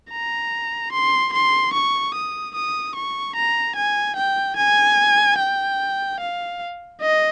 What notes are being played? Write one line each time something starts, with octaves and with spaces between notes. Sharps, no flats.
A#5
C6
C6
C#6
D#6
D#6
C#6
A#5
G#5
G5
G#5
G5
F5
D#5